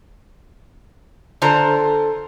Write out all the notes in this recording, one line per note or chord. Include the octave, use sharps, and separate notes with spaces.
D3 F4 A4 C5 A#5